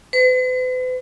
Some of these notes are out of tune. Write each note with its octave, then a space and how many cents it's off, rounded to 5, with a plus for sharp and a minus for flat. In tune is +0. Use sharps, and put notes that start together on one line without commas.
B4 +45